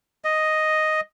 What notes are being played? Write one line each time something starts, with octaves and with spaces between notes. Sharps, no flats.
D#5